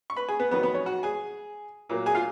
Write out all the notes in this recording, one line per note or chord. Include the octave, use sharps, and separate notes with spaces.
C#6
B4 B5
G#4 G#5
B3 B4
F2 D#3 F#3 B3 B4
B3 B4
C#4 C#5
F#4 F#5
G#4 G#5
A#2 F#3 A#3
G#4 G#5
F4 F5